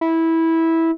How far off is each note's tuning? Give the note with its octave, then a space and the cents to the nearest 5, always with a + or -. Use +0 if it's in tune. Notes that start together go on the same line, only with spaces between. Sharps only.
E4 -15